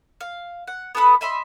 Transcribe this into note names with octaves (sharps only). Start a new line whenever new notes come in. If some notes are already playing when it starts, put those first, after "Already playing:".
F5
F#5
B3 A4 B4 D#6
D#5 E5 B5 C6